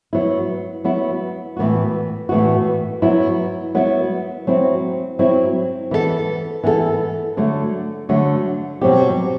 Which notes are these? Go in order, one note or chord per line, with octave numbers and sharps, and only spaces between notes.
F#3 B3 E4
F#3 B3 E4
A2 E3 B3 F#4
A2 E3 B3 F#4
F#3 B3 E4
F#3 B3 E4
F#3 C4 E4
F#3 C4 E4
E3 B3 E4 A4
E3 B3 E4 A4
D3 F#3 A3
D3 F#3 A3
B2 F#3 C4 G4